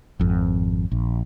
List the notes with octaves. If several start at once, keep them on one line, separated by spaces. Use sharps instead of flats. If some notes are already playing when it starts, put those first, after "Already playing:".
G#1 F2
A#1